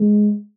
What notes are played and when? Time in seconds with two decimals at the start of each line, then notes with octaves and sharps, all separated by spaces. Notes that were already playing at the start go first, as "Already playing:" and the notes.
Already playing: G#3